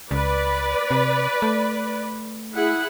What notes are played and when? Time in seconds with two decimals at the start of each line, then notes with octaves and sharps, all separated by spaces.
0.11 C#2 B4 D5
0.91 C3
1.42 A3
2.52 E4 G#4 F#5